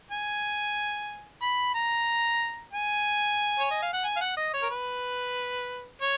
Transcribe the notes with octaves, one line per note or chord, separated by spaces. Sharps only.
G#5
B5
A#5
G#5
C#5
D#5
F5
F#5
G#5
F5
F#5
D#5
C#5
A#4
B4
C#5